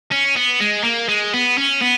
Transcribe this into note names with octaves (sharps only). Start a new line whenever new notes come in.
C#4
B3
G#3
A#3
G#3
B3
C#4
B3